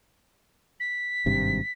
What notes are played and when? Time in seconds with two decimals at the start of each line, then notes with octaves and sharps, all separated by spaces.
0.80 B6
1.26 G#1 G2 C3